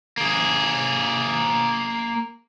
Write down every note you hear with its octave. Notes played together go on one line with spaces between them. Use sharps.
A#3 G#4